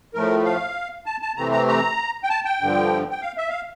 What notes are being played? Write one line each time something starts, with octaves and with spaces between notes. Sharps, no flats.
A2 F3 A3 A#4
F5
A5
A5
C3 E3 A3 C4 A#5
A#5
A#5
G5
A5
G5
G2 D3 F3
G5
F5
E5
F5